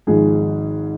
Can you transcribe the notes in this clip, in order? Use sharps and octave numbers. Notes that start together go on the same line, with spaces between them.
G#1 G#2 F3 G#4